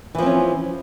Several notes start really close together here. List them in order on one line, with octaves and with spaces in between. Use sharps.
E3 F3 C4 C#4